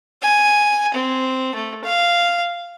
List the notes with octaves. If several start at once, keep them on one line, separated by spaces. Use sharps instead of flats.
G#5
C4
A3
F5